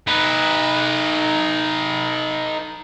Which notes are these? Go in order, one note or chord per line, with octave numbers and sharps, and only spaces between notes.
D#4 B4